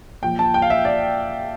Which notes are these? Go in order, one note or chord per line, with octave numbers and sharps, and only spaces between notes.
A#2 F3 G5
A5
G5
F5
E5
D5